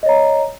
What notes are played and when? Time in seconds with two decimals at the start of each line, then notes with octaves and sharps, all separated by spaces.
0.03 D#5
0.06 C#5
0.09 A#5